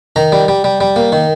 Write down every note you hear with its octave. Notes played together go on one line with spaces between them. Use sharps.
D#3 A#5
G3
G3
G3
G3
A#3
D#3